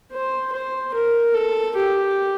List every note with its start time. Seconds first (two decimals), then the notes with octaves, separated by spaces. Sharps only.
0.12 C5
0.53 C5
0.94 A#4
1.34 A4
1.76 G4